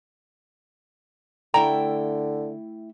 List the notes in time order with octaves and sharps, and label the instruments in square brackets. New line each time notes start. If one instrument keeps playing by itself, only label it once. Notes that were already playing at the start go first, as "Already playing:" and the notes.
[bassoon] D3 [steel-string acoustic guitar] A3 E4 G5 [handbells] A#5